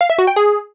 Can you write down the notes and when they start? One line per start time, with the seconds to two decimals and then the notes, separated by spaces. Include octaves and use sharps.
0.01 F5
0.10 E5
0.19 F#4
0.27 G5
0.36 G#4